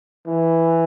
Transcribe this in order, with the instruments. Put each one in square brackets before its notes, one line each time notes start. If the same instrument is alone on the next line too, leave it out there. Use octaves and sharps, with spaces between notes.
[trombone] E3